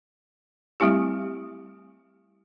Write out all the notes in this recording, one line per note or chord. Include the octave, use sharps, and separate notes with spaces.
G3 A3 C4 E4 G4